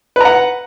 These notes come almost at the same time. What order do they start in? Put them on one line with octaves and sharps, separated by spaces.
B4 A#5 F#5